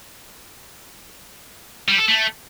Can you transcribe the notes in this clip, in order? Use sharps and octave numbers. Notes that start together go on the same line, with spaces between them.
G3
A4
A3